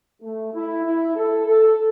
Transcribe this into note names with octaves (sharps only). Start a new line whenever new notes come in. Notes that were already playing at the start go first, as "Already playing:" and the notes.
A3
E4
E4
A4
A4